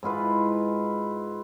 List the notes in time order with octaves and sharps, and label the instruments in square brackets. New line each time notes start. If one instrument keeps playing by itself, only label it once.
[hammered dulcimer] G#2 E4 F4 B4